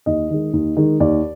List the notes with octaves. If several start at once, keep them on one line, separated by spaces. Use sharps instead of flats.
D#2 D#5
D#3 G#3
D#2
D#3 G#3
D#2 D5